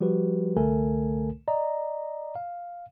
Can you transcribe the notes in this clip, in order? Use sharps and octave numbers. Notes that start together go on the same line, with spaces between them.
F3 G3 F#4 G4 B4
C2 D3 A3 A4 A#4 G#5
D5 D#5 A#5
F5